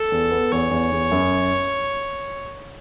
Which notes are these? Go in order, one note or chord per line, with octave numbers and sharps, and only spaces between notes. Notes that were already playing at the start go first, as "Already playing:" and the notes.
Already playing: A4
E2
B3
E2 C#5
E2
E2
F#2